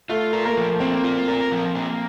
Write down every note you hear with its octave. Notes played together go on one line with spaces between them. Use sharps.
A3 F4
A#4
A#3
F3
A#3 C4
F4
A#4
F3
A#3